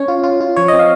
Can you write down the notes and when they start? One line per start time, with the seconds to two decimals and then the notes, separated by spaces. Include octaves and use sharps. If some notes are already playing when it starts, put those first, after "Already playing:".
Already playing: C#4 C#5
0.08 F4
0.23 F4
0.40 F4
0.56 F3 C#5
0.68 C4 D#5
0.79 F5